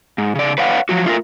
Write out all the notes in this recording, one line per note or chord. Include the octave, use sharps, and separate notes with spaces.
G#2
C#3 D5
B4 C#5 D5 F5 F#5
F3 F#3 F#4
A3 F4 G#4 A#4